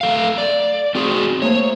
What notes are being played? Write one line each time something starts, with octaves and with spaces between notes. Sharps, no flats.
A3 A4 F5
D5
C4 F#4 G#4
A3 A#3 C5 C#5